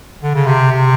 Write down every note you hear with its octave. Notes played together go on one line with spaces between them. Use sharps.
D3
C#3
C3
C3